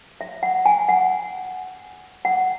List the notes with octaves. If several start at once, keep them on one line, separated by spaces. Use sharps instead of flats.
E5
F#5
G#5
F#5
F#5